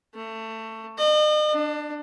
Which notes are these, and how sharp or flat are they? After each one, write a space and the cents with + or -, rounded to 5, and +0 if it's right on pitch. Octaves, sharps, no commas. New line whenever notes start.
A3 +20
D#5 -40
D4 +20